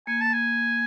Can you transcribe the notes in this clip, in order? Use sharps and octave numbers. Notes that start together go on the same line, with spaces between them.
A#3 G#5
A5
G#5